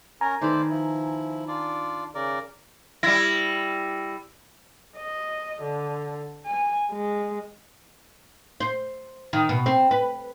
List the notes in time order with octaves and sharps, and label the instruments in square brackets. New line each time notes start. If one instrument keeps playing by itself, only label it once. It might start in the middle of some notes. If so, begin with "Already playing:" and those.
[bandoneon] C#4 A#4 [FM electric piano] G#5 A#5
[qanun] D#3 B4 [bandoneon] A3 C5 D5
[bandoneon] F3 E4
D4 F4 D5
C#3 A#4 D5
[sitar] G3 E4 [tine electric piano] A#6
[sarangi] D#5
D3
G#5
G#3
[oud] C5
D#3
B2
C4
B4